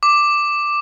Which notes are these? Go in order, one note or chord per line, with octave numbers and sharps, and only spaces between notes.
D6